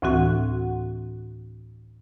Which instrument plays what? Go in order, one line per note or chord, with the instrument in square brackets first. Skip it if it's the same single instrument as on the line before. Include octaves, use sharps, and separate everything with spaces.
[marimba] D2 A2 E3 C4 F#4 F#5